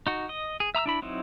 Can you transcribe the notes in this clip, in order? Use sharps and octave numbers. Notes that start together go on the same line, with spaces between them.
D#4 F#4
D#5
G#4
E5 A#5 D#6 E6
D4 E4 B5
F#3 C4 D#4 E4